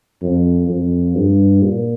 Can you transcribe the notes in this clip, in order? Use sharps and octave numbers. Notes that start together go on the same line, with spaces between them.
F2
F2
G2
A#2